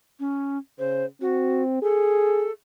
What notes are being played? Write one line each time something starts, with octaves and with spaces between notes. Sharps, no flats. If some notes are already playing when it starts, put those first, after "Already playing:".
C#4
C#3 C5
C4 F#4
G#4 A4